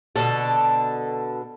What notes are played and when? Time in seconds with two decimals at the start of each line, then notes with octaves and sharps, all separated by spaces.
0.16 B2 D3 A4